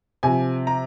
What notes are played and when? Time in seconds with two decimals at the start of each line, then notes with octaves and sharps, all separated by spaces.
0.23 C3 F3 G#5
0.67 A#5